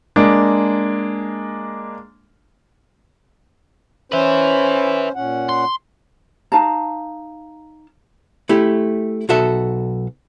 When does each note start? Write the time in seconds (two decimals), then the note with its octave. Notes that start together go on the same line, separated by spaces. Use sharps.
0.16 G#3 A#3 D4
4.12 C#4 B4 C5 E5
5.15 A#2 C#4 F#5
5.49 C6
6.52 D#4 F5 A5 A#5
8.49 A3 E4 G4
9.29 B1 F#4 A4 E5